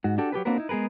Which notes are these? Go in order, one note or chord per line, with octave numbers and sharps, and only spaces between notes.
G#2 F#4
D4 F#4 G4 A4
F#3 G4 A4 B4
A#3 C4 D4 F#4 A#4 B4
D#4 E4
G#3 B3 G#4 A#4 B4